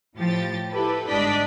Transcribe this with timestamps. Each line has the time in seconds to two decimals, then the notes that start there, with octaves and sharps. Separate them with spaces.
0.17 A2 F3 G4 A6
0.72 E4 G4 A4 B4
1.08 G1 G#2 D4 D5 D#5 B6